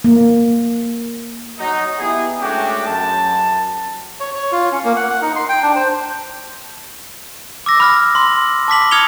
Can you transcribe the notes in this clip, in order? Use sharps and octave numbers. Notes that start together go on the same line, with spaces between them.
A#3
F#3 D#4
B3 E4 G4 G#4
G#3 A3 C#4 D4 F#4 G4
F#2 A5
C#5
C#5
F4
C#4
A#3
F#5
F#5
D#4
C6
G5
D4
C5
D6 E6 A#6
B5 F6 A#6
C6
C6
A5 D6 B6 F#7
D#6 F6 G#6 C#7 F7 G7